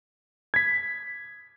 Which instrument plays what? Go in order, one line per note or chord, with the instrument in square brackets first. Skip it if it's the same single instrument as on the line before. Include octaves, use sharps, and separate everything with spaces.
[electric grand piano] G#6 B6